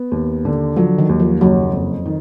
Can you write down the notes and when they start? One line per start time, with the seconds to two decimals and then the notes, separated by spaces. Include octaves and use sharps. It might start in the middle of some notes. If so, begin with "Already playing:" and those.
Already playing: B3
0.12 D#2
0.45 D3
0.76 F3 F#3
0.98 D#3
1.09 D#2
1.20 F3
1.40 F#1 F#3
1.73 F2
2.06 D#3